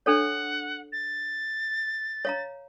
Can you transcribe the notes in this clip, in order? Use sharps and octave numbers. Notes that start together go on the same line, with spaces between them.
D4 A4 C#5 F#5
A6
C#5 F5 A#5